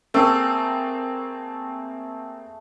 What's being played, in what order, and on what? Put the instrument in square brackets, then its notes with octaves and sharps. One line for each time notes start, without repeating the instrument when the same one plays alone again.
[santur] A3 G#4 [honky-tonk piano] A#3 C4